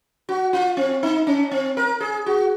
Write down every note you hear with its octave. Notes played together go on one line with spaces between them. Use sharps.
F#4
F4
C4
D#4
C#4
C4
A#4
G#4
F#4